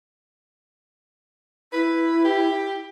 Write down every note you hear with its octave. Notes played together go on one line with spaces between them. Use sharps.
E4 B4
G4